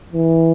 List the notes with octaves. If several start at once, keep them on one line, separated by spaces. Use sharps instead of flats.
E3